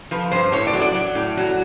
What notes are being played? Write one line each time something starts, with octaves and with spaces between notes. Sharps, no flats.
F3 B4
G2 C5
A2 C#5
D5
F#3
D5
F#3
A2
F#3